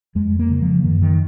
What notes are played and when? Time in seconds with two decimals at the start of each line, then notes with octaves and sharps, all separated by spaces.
0.15 F2 G#3
0.39 A#3
0.50 C#3
0.62 F3
0.84 F#2 D#3
1.02 D#3